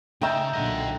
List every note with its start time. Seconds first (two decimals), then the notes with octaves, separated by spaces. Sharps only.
0.21 C#3 D#4 E5 G5 A#5 G6
0.54 B1 A#2 D3 D#5 F#5